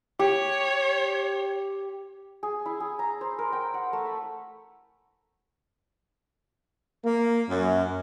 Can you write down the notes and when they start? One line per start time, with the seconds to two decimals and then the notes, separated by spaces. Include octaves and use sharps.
0.19 G4 C#5
2.43 G#4
2.66 E4
2.80 G#4
2.99 A#5
3.21 C5
3.39 A#4
3.53 G5
3.74 F#5
3.93 A3
4.05 B5
7.05 A#3
7.49 F#2